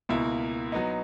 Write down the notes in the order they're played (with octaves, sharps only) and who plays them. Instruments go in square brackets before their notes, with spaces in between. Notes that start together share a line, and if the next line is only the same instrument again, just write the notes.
[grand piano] C#2 B2 A#3 E4
F#3 B3 D#4